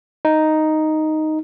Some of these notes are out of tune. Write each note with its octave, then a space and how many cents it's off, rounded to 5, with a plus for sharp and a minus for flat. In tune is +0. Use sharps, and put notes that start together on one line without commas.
D#4 +0